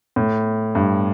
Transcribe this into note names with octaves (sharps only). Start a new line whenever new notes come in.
A2
G2